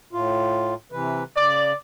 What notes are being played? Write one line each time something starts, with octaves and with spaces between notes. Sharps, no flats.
A2 F4
C3 E3 B4
C#3 D5